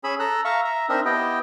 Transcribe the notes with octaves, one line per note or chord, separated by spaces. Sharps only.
C#4 G#4 B5 E6
A4 A#5 E6 F#6
E5 F5 A#5 C#6
E5 A#5
C4 D4 D#4 A#4 D#5 E5
B3 E4 G4 D#5 G5